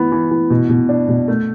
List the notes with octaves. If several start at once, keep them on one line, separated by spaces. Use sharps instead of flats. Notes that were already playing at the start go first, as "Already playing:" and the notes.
Already playing: E3 B3
E3
E3
B2
B2
D4
B2
A3